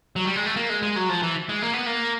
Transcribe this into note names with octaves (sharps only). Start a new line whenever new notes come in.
F#3
G3
G#3
A3
A#3
G#3
G#3
F#3
F3
E3
G#3
A#3
B3
A#3